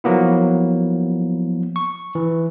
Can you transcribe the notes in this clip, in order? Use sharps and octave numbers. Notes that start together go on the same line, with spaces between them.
F3 F#3 A#3 B3 E4
C#6
E3